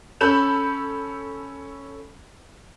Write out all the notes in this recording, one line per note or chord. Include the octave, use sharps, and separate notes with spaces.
C#4 A4 B5 G6 E7